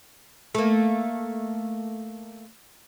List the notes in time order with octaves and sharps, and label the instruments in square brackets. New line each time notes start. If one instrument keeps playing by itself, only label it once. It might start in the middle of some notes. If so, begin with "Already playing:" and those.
[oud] A3 A#3